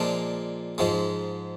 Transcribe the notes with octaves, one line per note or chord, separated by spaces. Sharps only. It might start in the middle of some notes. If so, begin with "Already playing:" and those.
Already playing: A#2 F3 G#3 D4 A#5
G#2 F3 G#3